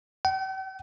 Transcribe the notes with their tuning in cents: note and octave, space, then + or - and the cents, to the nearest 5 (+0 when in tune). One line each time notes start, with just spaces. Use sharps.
G5 -45